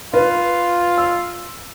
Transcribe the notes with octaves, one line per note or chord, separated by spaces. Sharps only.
F4 B4
E6